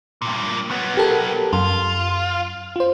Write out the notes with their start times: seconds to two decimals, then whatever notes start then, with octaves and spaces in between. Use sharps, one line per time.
0.22 G2 A#2
0.70 F#3 B3
0.97 G4 A4 A#4
1.53 F#2 F4
2.76 F4 C5